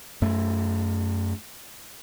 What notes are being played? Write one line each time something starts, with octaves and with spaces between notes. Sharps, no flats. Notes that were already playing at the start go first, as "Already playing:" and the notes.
F#2 A3